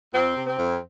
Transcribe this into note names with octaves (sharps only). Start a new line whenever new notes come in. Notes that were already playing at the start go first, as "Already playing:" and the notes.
F2 C4
C3
C4
F2